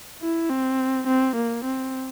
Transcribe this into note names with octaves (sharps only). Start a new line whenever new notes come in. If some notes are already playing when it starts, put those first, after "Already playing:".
E4
C4
C4
A#3
C4